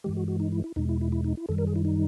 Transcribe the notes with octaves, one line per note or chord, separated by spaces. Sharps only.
G2 E3 G#3 G4
F#4
F#4
D#4
E4
E4
E2 B2 G#3 D#4
E4
E4
E4
D#4
E4
F#2 D#3 G3 A4
A#4
G#4
E4
D#4